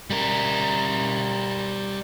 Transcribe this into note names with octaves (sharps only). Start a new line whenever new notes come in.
G3 A#4